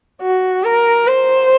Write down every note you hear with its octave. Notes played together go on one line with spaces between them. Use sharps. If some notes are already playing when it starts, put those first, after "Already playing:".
F#4
A#4
C5